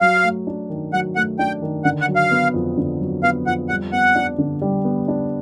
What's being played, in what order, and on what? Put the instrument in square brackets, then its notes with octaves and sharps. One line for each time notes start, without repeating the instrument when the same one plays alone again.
[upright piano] F#3 [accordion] F5
[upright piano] A3
D4
D#3
[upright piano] F#3 [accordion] F#5
[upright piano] A3 [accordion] F#5
[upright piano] D4 [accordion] G5
[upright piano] D#3
[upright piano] D3 [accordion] F#5
[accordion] F#5
[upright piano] F#3
[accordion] F5
[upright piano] B3
F2
D3
F#3
[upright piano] B3 [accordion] F5
[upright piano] F2 [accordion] F#5
[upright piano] G3 [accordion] F#5
[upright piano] B3 [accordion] F#5
[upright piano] D4
D3
G3
B3
D4